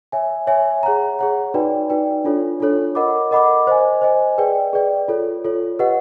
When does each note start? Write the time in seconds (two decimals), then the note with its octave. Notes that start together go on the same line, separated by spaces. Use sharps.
0.12 C#5 E5 G#5
0.47 C#5 E5 G#5
0.83 G#4 C#5 F#5 A#5
1.19 G#4 C#5 F#5 A#5
1.54 D#4 F#4 B4 D5 G5
1.89 D#4 F#4 B4 D5 G5
2.24 D4 F4 A4 C#5
2.60 D4 F4 A4 C#5
2.95 A#4 D#5 F#5 B5 D6
3.31 A#4 D#5 F#5 B5 D6
3.67 C5 D#5 G#5
4.02 C5 D#5 G#5
4.38 G#4 B4 D5 G5
4.73 G#4 B4 D5 G5
5.08 F4 A4 C#5
5.44 F4 A4 C#5
5.79 G4 B4 D#5 F#5